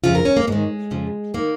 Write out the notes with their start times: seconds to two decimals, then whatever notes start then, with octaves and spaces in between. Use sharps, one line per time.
0.04 F2 C#3 F3 F4
0.15 A#4
0.25 C#4
0.37 A#3
0.47 G#2 D#3 G#3
0.91 F2 C#3 F3
1.34 D#3 A#3